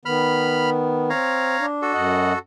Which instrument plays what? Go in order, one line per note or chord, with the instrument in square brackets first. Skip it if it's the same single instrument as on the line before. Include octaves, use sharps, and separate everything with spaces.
[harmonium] D#3 B3 [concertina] B5 F6
[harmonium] C4 [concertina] C#5 F5 A#5
[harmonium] D4
[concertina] F#4 A4
[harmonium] F#2 D#5 F#5